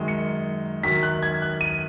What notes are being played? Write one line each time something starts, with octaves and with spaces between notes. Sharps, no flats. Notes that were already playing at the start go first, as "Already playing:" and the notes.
Already playing: F#2 D#3 G#3
C#7
F#2 D#3 F#3 B6
F#6
G#6
F#6
D#7